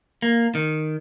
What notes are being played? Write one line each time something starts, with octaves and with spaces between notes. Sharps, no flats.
A#3
D#3